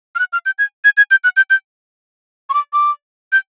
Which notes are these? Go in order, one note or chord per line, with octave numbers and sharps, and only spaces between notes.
F6
F#6
F6
G6
G#6
G#6
G#6
G6
F#6
G6
G6
C#6
D6
D6
G6